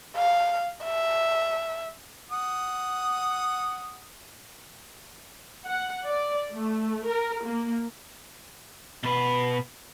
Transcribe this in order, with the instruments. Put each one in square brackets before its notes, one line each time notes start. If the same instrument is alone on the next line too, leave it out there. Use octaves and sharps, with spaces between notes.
[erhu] F5
E5
[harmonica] F#5 D#6
[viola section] F#5
D5
A3
A#4
A#3
[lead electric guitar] B2 B4